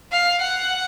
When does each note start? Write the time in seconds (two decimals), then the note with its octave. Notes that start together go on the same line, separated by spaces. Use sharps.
0.12 F5
0.41 F#5